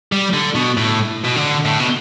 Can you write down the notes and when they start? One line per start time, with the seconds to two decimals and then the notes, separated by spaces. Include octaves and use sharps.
0.12 G3
0.34 D3
0.55 B2
0.77 A2
1.24 B2
1.36 D3
1.65 A2
1.80 B2